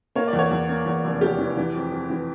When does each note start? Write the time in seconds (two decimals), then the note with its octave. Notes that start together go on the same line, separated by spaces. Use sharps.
0.15 A#3 C#5
0.28 D5
0.33 E2
0.39 C#5
0.51 E2
0.69 A#3
0.86 E2
1.04 F1
1.21 E2 G4
1.38 E3
1.57 E3
1.74 F2
1.92 F2
2.10 E3